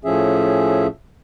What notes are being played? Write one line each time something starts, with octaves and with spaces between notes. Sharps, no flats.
A2 F3 C#4 G#4 E5